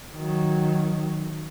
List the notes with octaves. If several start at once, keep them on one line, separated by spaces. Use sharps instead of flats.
D#3 F#3